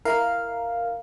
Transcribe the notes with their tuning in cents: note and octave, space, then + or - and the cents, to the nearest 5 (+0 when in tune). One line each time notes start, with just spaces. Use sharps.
E4 +0 A#4 +0 F5 +0